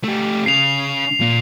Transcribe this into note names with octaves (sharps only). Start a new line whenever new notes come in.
A3 G4
C#3 C7 F7
A#2